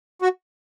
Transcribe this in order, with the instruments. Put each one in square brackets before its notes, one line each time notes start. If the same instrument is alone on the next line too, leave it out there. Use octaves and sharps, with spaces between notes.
[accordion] F#4